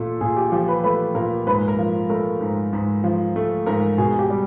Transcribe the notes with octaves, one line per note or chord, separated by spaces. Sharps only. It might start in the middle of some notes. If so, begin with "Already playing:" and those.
Already playing: A#2 A3 A4
A#2 G#4
G4
F3 G4
B4
A3 B4
A#2 A#4
G#2 B4
A#4
F3
A3 A#4
G#2
G#2
F3
A3
G#2 A#4
B2 G#4
G4
G3